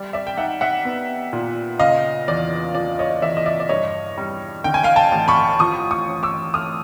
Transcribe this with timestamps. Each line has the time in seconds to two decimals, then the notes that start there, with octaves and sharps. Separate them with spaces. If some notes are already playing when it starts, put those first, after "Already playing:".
Already playing: G3 D5
0.13 D5 E5
0.27 G5
0.37 D#4 E5 F#5
0.61 E5 F#5
0.85 B3
1.33 A#2
1.79 C#3 D#5 F5
2.28 E2 D5
2.75 F3 D5
2.99 C#5 D#5
3.22 E2 D5 E5
3.37 D#5
3.46 D5 E5
3.60 D5
3.69 G2 C#5 D#5
4.18 G3
4.64 D3 G5
4.74 G#5
4.83 F5 G5
4.96 G5 A5
5.12 A1
5.28 B5 C#6
5.59 F3 C#6 D#6
5.91 C#6 D#6
6.07 C#4
6.23 D6 E6
6.54 A3 D#6 F6